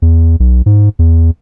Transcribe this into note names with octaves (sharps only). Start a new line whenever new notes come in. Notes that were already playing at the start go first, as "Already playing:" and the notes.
E2
B1
G#2
E2